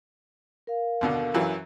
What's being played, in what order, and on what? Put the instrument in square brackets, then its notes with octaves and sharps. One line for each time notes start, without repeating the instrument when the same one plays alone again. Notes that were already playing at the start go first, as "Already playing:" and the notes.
[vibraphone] A#4 F5
[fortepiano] D#2 B2 D3
F#2 E3 F#3